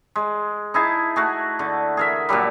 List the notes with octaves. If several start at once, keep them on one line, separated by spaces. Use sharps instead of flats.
G#3
D#4 E4 G#4 A5
A3 F#4 G#4
D3
G#4 A#4 E5
A#2 D3 F#3 G3